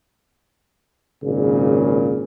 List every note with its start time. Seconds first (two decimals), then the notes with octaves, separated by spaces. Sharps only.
1.23 G#1 A#2 C#3